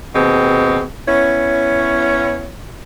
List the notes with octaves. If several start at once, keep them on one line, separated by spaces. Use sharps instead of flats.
D#2 B2 C4 G#4
B3 C#4 E4 C#5